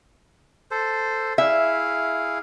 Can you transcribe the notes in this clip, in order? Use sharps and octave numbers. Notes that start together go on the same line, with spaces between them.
A4 C5
E4 G#4 E5 F5